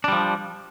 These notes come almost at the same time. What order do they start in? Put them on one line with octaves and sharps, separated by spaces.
D4 G3 F3